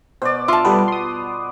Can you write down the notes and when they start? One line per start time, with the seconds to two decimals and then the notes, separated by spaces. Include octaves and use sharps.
0.22 B2 C5 D5
0.48 F4 E5 A5
0.65 G3 B3 A4 B4
0.88 C6 D#6